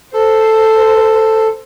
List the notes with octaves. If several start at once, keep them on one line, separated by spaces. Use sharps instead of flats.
A4 C5